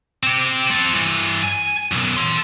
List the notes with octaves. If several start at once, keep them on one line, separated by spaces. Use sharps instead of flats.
C4 G4
C4 A4
G2 E3
G#5
B1 F#2
A4 C6